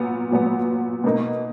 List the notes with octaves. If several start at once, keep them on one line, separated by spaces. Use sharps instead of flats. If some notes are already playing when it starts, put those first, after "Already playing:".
Already playing: A#2 F#3 B3
A#2 F#3 B3
B2 A#3 D#4